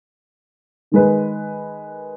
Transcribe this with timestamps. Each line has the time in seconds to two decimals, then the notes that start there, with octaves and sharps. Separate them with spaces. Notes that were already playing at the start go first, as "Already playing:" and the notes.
0.92 D#3 G#3 B4